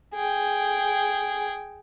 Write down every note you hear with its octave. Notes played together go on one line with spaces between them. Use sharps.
G#4 G5